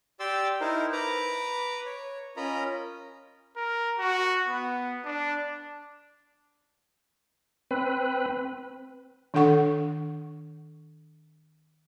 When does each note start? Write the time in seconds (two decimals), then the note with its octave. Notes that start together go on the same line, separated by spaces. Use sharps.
0.20 G4 D5 C6 D6 E6
0.61 D#4 E4 A#4 C5
0.93 B4 A#5 D6
1.86 C#5
2.37 C#4 F4 A#4 D#5 A#5 B5
3.56 A#4
3.99 F#4
4.48 B3
5.05 D4
7.71 C4 B4
9.34 D#3 D4 A4 F#5 C#6